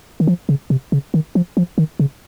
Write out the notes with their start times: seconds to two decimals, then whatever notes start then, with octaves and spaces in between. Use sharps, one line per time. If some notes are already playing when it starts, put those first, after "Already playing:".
0.20 D#3
0.27 F3
0.49 C#3
0.70 C3
0.92 C#3
1.14 D#3
1.35 F3
1.57 F3
1.78 D#3
2.00 C#3